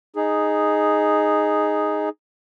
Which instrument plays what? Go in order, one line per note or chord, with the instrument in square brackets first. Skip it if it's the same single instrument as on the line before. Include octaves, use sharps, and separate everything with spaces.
[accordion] D#4 G#4